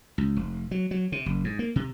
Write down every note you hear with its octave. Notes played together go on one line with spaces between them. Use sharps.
C#2
F1
F#3
F#3
C3
F#1
G#2
A#3
C3